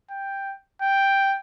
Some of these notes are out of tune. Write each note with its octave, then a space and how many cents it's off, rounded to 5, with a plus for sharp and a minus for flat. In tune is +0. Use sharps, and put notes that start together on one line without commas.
G5 +5
G5 +0